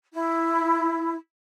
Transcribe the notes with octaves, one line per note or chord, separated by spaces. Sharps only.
E4